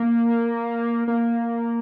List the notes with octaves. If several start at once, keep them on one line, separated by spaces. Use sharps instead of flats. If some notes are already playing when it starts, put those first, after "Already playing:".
Already playing: A#3
A#3